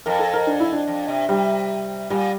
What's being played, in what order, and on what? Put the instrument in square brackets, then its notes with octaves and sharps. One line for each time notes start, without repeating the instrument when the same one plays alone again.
[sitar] F2 [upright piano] A#4
[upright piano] A4
A#4
D4
E4
D4
[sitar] F2
C3
[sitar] C3 [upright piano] G3
[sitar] A#2 [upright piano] G3